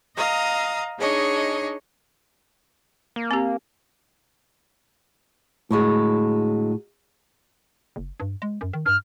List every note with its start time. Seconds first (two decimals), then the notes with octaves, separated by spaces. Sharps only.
0.16 D#5 F5 A#5 D#6
0.98 D4 D#4 G#4 C#5 D#5
3.16 A#3
3.31 C4 G4
5.71 A2 D3 F#3 G#3
7.96 F#1
8.20 G2
8.42 G#3
8.61 F#2
8.73 D#3
8.86 G2 F6